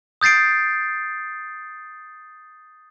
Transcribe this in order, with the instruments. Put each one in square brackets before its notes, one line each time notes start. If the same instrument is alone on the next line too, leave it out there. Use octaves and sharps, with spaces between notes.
[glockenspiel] D#6 G6 A6 C7 D7